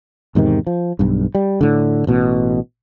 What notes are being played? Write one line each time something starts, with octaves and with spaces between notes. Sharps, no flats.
E2 G#2 C3 D#3
F3
B1 G2
G3
A2 D3
A1 B2